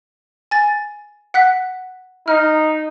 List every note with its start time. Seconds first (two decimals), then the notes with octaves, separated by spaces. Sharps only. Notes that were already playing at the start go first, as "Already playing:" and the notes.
0.51 G#5 A6
1.34 F#5 F#6 B6
2.28 D#4 F6